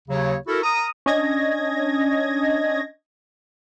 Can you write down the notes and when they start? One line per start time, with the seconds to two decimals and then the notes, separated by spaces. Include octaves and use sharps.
0.08 D#2 C#3 F#3 C#5
0.47 E4 F#4 A4 A#4
0.63 A#4 A#5 D#6
1.06 C#4 D4 D#5 G#6 A#6